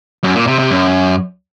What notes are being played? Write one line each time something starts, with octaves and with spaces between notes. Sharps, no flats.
F#2
A#2
C3
C3
F#2